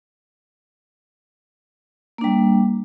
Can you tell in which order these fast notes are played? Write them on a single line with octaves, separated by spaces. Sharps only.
A#3 D4 G3